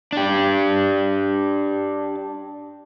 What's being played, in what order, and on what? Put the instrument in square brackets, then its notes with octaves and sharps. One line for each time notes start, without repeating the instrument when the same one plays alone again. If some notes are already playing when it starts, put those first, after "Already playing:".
[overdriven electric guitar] D4 G4